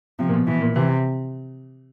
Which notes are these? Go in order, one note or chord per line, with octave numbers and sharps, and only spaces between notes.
C3 F3
A#2
B2
B2 E3
A#2
C3 E3